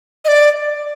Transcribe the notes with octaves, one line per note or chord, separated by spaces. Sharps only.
D#5
D5